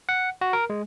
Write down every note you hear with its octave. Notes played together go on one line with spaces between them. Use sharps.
F#5
F#4
A#4
G#3